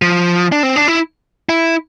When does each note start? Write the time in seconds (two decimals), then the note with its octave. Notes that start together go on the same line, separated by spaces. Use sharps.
0.02 F3
0.52 D4
0.63 C4
0.76 D4
0.88 E4
1.49 E4